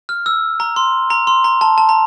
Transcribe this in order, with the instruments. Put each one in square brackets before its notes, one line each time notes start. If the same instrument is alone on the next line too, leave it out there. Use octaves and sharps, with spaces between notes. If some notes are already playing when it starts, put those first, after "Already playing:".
[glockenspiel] F6
E6
A#5
C6
A#5
C6
A#5
A5
A5
A#5